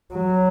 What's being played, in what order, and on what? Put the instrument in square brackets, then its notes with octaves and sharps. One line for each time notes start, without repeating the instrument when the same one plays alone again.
[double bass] F#3